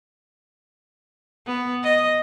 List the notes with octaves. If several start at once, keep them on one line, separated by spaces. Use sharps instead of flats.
B3
D#5